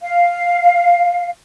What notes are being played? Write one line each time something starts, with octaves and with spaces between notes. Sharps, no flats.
F5